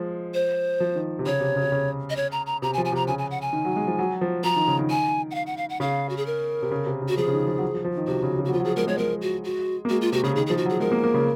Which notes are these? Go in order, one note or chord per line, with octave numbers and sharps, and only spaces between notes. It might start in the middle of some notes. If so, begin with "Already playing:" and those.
Already playing: F3 G#3
C5
F3
D#3
C3
C#3 C#5
C3
C#3
C3
C#3
D#5
C#5
A#5
A#5
C3 A#5
G#5
F3
G#5
C3 A#5
C#3 G#5
G#5
F#5
G#5
D#3
F#3
G#3
F3
F#3
F3
F3 A#5
D#3
C#3
D#3
G#5
F#5
F5
F#5
F5
F#5
C#3 F5
F#4
G#4
A#4
C3
C#3
C3
C#3
F#4
F3 G#4
C#3
D#3
F3
F#3
F3
F3
F3
D#3
C3 F#4
C#3
C#3
F#4
F#3
F3 F4
F#3
F3 G#4
G#3 A#4
G#3 C#5
G#3 A#4
F#4
F#4
A#3
G#3 F#4
F4
C3 F#4
C#3 G#4
D#3 G#4
G#4
F3
F#4
F#3 G#4
G#3 A#4
A#3
A#3
C#3